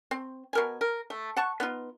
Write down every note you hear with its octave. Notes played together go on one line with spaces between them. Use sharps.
C4
B2 A#4 G#5
A#4
A3
F#5 A5 C#6
B3 D#4 F4